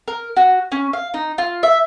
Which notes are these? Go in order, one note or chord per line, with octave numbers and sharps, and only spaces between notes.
A#4
F#4
C#4
F5
D#4
F4
E5